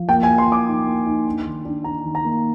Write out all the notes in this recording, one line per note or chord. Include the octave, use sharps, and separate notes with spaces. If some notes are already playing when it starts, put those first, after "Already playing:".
Already playing: F3
A#3 G5
G#5
F3
C6
F3 D6
D#4
A#3
D#4
D4
D#3
D4
D4 A#5
D#3
A#5
A#3